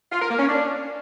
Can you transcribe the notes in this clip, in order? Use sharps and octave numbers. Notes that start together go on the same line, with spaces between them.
F4
A#4
A#3
C#4
D4